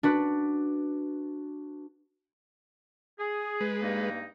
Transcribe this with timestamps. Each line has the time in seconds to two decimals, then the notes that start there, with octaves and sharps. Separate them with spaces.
0.03 D4 F#4 B4
3.19 G#4
3.61 G#3 B4
3.82 G2 A#3 D#4